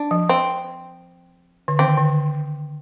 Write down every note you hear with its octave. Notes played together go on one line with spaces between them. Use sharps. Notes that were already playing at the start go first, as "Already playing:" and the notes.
Already playing: D4
F3
C4
D3
D#3 C4
D3